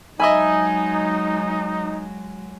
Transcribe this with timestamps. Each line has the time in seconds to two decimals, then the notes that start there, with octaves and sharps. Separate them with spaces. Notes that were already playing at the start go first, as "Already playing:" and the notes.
0.20 F#3 G#3 D#4 D#5 E5 G#5 B5